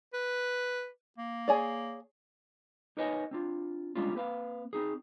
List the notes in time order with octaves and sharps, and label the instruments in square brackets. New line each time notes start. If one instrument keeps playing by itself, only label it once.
[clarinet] B4
A#3
[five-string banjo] G#4 C#5 D5
[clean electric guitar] D#4 A#4 B4 C#5 D#5 G#5
C4 D4 F4
G3 G#3 A#3 C#4 D4 F4
A#3 C4 B4 F5
C4 D#4 G#4